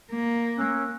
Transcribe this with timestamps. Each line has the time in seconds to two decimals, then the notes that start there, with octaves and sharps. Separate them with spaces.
0.12 A#3
0.56 C#4 E6 F#6